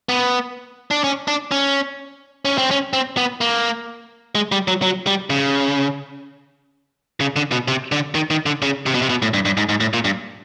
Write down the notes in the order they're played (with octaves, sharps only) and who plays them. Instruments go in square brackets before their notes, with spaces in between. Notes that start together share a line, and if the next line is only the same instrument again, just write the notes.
[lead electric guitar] B3
D4
C#4
D4
C#4
C#4
C4
C#4
C4
B3
A#3
G#3
G3
F#3
F#3
G3
C#3
C#3
D3
B2
C3
D3
D#3
D#3
D3
C#3
C3
B2
C3
B2
A2
G2
G2
G#2
G#2
A2
A#2
G2